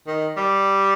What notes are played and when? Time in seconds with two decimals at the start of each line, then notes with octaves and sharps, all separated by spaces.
0.07 D#3
0.37 G3